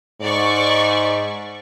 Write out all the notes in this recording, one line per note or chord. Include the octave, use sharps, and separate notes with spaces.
G#2 D5 C#6